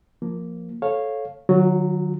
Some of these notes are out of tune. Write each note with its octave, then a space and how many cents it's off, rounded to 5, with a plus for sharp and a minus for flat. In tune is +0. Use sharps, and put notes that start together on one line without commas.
F3 +0 A#3 +0
A4 -15 C#5 -10 F5 +0
D#3 -45 F#3 +0 F4 +45